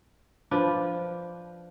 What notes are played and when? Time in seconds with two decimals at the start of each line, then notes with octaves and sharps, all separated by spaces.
0.51 F3 D4 B4